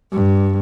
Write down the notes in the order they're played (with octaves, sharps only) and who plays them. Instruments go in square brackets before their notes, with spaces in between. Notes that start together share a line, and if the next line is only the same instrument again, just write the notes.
[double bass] G2